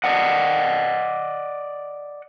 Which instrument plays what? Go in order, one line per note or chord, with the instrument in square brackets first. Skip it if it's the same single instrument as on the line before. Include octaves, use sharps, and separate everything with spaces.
[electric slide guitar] D5 D#5 F#5